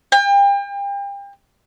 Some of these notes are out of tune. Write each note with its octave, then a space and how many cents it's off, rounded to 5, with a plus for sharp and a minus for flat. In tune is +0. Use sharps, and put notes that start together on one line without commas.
G5 +35